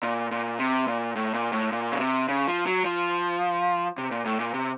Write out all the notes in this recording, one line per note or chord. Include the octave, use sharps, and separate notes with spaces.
A#2
A#2
C3
A#2
A2
A#2
A2
A#2
C#3
C3
C#3
F3
F#3
F3
C3
A#2
A2
A#2
C3